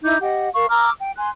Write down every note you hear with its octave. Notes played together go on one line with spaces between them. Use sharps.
D#4 E4 D6 G6
G4 D#5 F#5
A#4 F5 C#6
A#5 D6 E6 F6
G5
G#5 C6 F#6